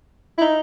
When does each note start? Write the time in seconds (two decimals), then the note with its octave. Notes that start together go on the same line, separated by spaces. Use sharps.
0.38 E4
0.41 D#4